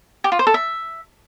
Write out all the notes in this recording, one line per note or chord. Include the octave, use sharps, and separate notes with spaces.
G4
F4
C5
A4
E5